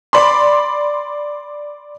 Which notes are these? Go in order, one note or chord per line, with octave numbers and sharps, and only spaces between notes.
D5 B5 C6